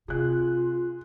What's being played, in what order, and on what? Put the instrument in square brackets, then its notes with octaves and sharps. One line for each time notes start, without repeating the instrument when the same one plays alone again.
[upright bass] C3 [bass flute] F4 [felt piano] G#4 F#6